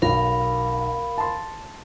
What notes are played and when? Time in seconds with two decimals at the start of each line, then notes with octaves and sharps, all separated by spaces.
0.02 B1 A#4 F5 B5
1.18 A5 C6